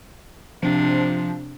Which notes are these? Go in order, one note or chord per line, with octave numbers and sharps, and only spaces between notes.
C3 F3 D4